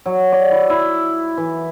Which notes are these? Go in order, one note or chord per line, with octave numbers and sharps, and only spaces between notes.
F#3
D5
E4
E4
E3